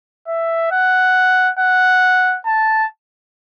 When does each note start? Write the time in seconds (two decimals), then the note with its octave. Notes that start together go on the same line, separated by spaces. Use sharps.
0.28 E5
0.71 F#5
1.59 F#5
2.46 A5